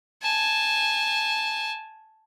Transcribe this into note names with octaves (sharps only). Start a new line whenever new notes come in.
G#5 A5